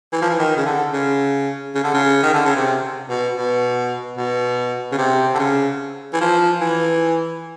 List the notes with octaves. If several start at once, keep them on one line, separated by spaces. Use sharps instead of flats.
E3
F3
E3
D#3
C#3
D3
C#3
C#3
D3
C#3
D#3
D3
C#3
C3
B2
B2
B2
C#3
C3
D3
C#3
E3
F3
E3